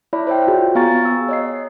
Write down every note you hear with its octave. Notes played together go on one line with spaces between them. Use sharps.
E4 C#5 D5 E5 B5
C5 C#5 E5 G5
F4 F#4 G#4
B3 F5 G#5 A#5 C#6 A6
E6
C#5 D#5 C7